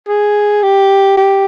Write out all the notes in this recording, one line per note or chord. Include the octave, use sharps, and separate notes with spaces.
G#4
G4
G4